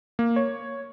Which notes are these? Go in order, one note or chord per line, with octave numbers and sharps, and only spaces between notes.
A#3
C#5